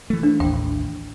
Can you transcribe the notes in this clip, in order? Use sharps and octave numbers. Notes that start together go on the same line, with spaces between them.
E3 A3
D4
A1 D#2 G5